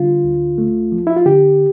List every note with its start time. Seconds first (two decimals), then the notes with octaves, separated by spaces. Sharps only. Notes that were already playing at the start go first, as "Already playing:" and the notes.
Already playing: D3 G3 F4
0.24 D2
0.58 A3
0.92 F3
1.07 E4
1.16 F4
1.26 D3 G4